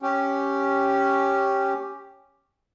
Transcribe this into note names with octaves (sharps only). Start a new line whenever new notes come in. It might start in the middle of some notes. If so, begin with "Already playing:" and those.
C#4 G4